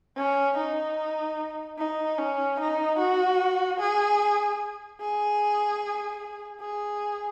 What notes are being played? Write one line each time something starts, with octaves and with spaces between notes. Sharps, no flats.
C#4
D#4
D#4
C#4
D#4
F#4
G#4
G#4
G#4